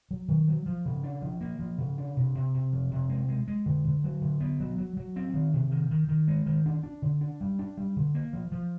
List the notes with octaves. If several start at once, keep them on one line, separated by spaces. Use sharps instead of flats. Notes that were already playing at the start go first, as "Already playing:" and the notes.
F#3
D#3
F#3
F3
C#3
D4
F3
A#3
F3
C#3
D4
C3
C3
C3
F3
C3
G#3
G#3
G#3
D3
D3
F#3
D3
B3
F#3
F#3
F#3
C4
D#3
C3
D#3
D#3
D#3
G#3
D#3
D4
D4
D3
D4
G3
D4
G3
D3
A#3
F3
F3